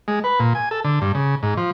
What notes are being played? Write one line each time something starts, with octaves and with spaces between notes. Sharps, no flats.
G#3
B4
A#2
G#5
A4
D3
G2
C#3
G#2
F3